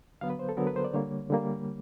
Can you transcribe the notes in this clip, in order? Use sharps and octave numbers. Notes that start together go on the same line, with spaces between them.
D3 F#3 B3 F5
B4
C5
A4
D3 F#3 B3 A#4
B4
C5
D5
D3 G3 A#3 C#5
D3 G3 A#3